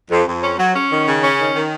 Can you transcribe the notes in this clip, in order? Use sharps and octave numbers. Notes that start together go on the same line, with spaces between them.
F2
F2
C#4
F#3
C#4
D#3
C#3
C#4
D#3
D#3